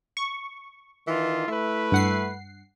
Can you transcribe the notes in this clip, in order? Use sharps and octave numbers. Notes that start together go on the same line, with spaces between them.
C#6
D#3 E3 F4
A3 E4 B4
G2 F#5 C7